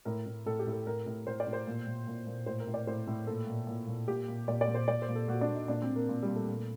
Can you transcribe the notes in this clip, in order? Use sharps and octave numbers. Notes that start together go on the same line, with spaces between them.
A2 A#4
A2
A2 A4
G4
A2
A4
A2 A#4
A2
A2 C5
D5
A2
C5
A#2
A#2
A#2
A#2
A2 C5
A#4
A2
D5
A2 C5
A2
A#2 A4
A#2
A#2
A#2
A#2 G4
A#2
A#2 D5
D5
A#2
C5
A#2 D5
C5
A#2
A4
A#2 F#4
D4
A#2
D#4
A#2 D4
C4
A#2
A#3
A#2
G3
A#2
A3
A#2